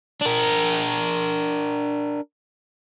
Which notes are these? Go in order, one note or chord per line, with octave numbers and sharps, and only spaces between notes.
D4 A#4